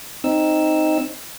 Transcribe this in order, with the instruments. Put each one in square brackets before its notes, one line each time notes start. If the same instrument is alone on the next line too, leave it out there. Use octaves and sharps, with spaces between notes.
[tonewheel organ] C4 D#4 E6